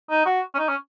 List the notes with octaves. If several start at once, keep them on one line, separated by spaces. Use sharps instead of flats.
D#4
F#4
C#4
D#4
C#4